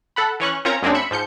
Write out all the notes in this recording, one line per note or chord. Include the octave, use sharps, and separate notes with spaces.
A4 F#5 B5
E3 C#4 C#6 F#6
C4 C#4 F4 A#4 C#5 A#5
F#2 F#3 G#3 A#3 C4 D4
E5 B5 C#7
G#2 F3 G6 C#7